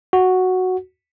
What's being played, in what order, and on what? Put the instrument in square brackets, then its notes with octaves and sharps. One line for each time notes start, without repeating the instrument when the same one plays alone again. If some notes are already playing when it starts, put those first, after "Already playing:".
[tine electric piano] F#4